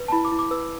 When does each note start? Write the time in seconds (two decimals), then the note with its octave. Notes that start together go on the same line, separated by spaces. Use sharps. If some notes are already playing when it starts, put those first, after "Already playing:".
Already playing: B4
0.08 A5
0.12 E4 B5
0.25 D6
0.32 E4
0.39 D6
0.51 B4 E6